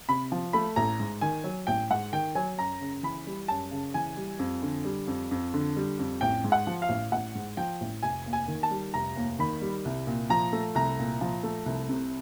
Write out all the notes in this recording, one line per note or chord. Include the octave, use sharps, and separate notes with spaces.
C3 B5
F3
A3 B5
A1 A#5
G#2
D#3 G#5
F#3
A1 G5
G#2 F#5
D#3 G5
F#3 G#5
F#2 A#5
C#3
E3 B5
G3
F#2 A5
C#3
E3 G#5
G3
F2
D3
G3
F2
F2
D3
G3
F2
A1 G5
G#2
F#5
F3
F5
A1
A1 F#5
G#2
F3 G5
A1
F1 G#5
D#2
G#5
D#3
A5
G3
F1 A#5
D#2
D#3 B5
G3
C2
A#2
F3 A#5
A3
C2 A#5
A#2
F3
A3
C2
C3